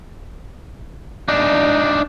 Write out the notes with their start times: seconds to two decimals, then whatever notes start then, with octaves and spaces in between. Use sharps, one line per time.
1.28 D4 D#4